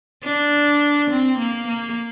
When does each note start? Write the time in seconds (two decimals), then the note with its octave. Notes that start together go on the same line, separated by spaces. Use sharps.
0.23 D4
1.10 C4
1.39 A#3
1.68 A#3